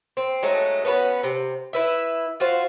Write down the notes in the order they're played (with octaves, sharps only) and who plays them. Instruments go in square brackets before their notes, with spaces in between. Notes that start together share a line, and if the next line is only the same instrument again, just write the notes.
[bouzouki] C4
F#3 G#3 A3 D#4
B3 C#4 F#4 B4
C3
E4 B4 E5
F4 F#4 C5